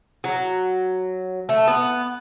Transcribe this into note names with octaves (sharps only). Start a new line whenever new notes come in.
F#3
A3
B3